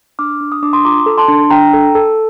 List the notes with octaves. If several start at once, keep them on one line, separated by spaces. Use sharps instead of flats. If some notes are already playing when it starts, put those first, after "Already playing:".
D4 D6 F6
D4
D#6
D4 D6
C6 D#6
F4 A#5 D6
A4
A5 C6
D4
D4 G5 A#5
A4
A4